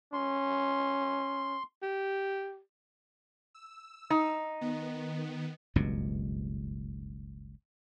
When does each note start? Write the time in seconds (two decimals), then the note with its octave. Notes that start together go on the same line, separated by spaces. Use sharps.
0.13 C#4 C6
1.83 G4
3.54 E6
4.10 D#4
4.61 D#3 B3
5.76 F#1 C#2 G2 B2